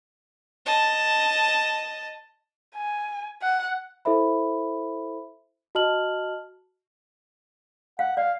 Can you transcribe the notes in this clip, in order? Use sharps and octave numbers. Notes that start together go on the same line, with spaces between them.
D#5 A5
G#5
F#5
E4 A4 C5 E5 B5
F#4 D#5 A5 F6 F#7
F5 F#5
D5 F5